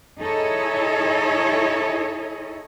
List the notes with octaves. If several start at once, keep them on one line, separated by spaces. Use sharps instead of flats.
D#4 E4 G#4 A4 C#5 D#5